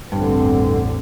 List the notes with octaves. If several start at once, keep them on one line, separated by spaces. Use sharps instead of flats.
A1 E2 G2 D3 C4